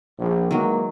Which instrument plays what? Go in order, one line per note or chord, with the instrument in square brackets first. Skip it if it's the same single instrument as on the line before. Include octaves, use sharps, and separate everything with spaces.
[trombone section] A#1
[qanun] D#3 F#3 [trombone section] E3 G#3 A#3